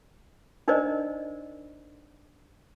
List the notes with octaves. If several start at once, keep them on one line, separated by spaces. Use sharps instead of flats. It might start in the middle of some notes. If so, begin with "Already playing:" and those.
D4 D#4 A#4 C5 D5 D#5